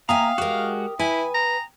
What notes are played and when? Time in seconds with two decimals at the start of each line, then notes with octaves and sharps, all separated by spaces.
0.09 A#3 E5 F5 G5 G#5 A#5 D#6
0.38 G#3 F#4 G4 A#4
0.99 E4 B4 G#5
1.34 A#5